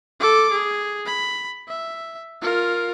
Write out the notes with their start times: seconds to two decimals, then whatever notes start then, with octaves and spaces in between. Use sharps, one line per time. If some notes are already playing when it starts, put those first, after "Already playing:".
0.20 A4 D6
0.52 G#4
1.06 B5
1.68 E5
2.42 F4 A#4